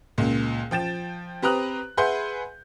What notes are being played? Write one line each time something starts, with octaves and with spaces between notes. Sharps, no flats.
C#2 A#2
F3 G5 A6 E7
C4 G4 B4 A#5 D#6 F#6
G#4 B4 E5 F#5 C6 G6